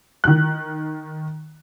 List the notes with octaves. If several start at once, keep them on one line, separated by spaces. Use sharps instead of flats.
D#3 F#6